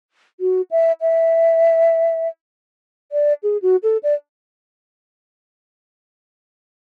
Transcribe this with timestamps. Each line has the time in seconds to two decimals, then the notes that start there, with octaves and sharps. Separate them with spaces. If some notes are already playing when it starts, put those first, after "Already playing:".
0.40 F#4
0.71 E5
1.01 E5
3.12 D5
3.43 G#4
3.62 F#4
3.83 A4
4.03 D5